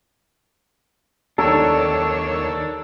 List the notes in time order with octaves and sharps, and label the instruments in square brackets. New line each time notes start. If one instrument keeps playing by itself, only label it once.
[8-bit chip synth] D#2 C#5 E6 [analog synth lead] D#3 [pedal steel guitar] D4 [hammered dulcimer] A4 A#4